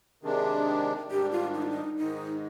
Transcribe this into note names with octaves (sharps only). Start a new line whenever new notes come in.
C3 D#3 G#3 D4 G#4
G#2 D#3 G3 D4 G4
F4
D#4
F4
D#4
G#2 D#3 G#3 D#4